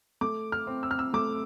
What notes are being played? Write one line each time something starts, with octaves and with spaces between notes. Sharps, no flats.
A3 D6
F6
C4
E6
F6
E6
A3 D6